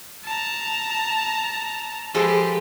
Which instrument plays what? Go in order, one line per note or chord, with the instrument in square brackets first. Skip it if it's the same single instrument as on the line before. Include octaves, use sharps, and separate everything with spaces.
[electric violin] A5 A#5
[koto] F3 G#3 A4 [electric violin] G4 B4